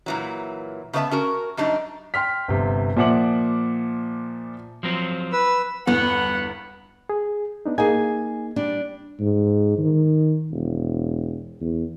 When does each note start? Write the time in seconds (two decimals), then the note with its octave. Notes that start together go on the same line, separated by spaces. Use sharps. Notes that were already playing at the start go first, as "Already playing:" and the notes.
0.06 A#2 E3 F#3
0.93 C#3 A3 B3 B4 E5 A5
1.11 C#4 F#4 A#4
1.57 F#2 G3 D4 D#4
2.14 G5 C6 F6 B6
2.48 G1 C3
2.96 A#2 F3 E5 F#5 D6 F#7
4.83 F3 F#3 C4
5.33 B4 E6
5.87 G1 E2 G2 B3 F#5
7.10 G#4
7.66 B3 D4 D#4
7.78 A#3 D#4 G#4 G#5 G#6
8.56 G3 D4 D5
9.20 G#2
9.78 D#3
10.51 E1
11.61 E2